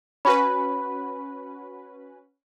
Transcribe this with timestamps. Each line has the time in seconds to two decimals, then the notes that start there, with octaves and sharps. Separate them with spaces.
0.25 C#4 F#4 B4 B5